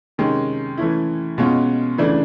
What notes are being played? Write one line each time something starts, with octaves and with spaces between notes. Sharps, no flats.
C3 D#3 G#3 C#4
E3 A3 C#4 E4
B2 G#3 C#4 F4
C#3 E3 A3 D4